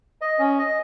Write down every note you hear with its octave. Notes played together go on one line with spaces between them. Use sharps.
D#5
C#4
D#5